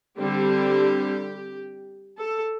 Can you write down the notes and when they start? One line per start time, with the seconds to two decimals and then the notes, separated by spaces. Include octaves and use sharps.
0.18 D3 G3 C4 G4
2.17 A4